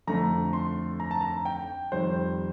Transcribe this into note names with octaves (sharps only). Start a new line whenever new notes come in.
F2 D3 A3 A#5
C6
A#5
A5
A#5
G5
F2 D#3 G3 C5